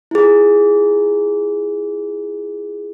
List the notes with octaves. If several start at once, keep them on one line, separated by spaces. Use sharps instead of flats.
E4 F4 G#4